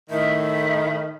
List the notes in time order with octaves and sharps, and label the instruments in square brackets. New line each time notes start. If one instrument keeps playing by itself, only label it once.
[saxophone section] A2 D#3 [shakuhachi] E5